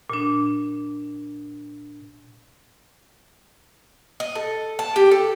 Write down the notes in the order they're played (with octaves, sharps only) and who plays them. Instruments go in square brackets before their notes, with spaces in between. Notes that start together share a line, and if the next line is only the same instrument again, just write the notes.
[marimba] A#2 D4
[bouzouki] D#5
A4
A5
G4
A4